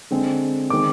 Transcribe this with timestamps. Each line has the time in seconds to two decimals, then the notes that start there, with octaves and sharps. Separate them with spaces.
0.11 D3 G#3 C4
0.70 D#3 G#3 C4 D6